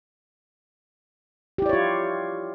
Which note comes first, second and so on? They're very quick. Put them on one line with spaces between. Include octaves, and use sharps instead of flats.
G4 E4 D5 C#5 F4